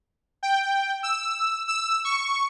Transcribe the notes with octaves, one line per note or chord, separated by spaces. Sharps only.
G5
E6
E6
C#6